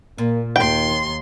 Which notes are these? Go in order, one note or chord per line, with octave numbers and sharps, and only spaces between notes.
A#2 A#3
D#2 D#3 G5 C6